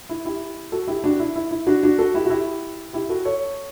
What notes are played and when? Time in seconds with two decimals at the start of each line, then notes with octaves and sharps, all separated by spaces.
0.09 E4
0.25 E4 G4
0.72 F#4 A4
0.88 E4 G4
1.04 D4 F#4
1.20 E4
1.36 E4
1.51 E4
1.67 D4 F#4
1.83 D4 F#4
1.98 F#4 A4
2.14 E4 G4
2.25 F#4
2.30 E4 G4
2.93 E4 G4
3.09 F#4 A4
3.25 A4 C#5